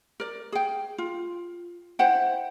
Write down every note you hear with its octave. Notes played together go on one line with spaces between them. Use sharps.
A#4 D5
G#4 G5
F4
E4 C5 F#5 G5